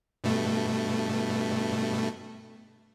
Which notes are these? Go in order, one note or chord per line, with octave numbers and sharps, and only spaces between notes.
G2 B2 A3